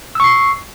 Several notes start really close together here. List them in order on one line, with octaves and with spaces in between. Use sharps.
E6 C#6 C7